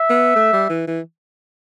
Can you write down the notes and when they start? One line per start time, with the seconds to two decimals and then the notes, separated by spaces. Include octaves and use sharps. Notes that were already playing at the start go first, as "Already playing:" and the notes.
Already playing: E5
0.10 B3
0.35 A3
0.53 G3
0.69 E3
0.87 E3